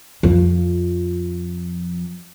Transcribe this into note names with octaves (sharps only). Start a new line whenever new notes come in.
F2 F3